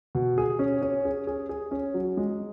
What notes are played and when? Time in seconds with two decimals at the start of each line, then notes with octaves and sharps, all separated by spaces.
0.15 B2
0.38 G#4
0.59 C#4
0.82 C#4
1.05 G#4
1.27 G#4
1.49 G#4
1.71 C#4
1.94 F#3
2.17 G#3